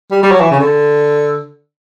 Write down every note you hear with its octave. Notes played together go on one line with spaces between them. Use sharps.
G3
G3
F#3
E3
C#3
D3